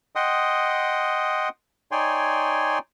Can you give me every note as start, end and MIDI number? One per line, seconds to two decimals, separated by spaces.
0.16 1.49 75
0.16 1.49 78
0.16 1.49 79
0.16 1.49 84
0.16 1.49 87
1.92 2.78 63
1.92 2.78 73
1.92 2.78 74
1.92 2.78 79
1.92 2.78 80
1.92 2.78 84